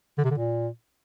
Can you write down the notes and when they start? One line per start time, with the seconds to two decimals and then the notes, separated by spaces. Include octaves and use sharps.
0.18 D3
0.24 C3
0.31 D3
0.37 A#2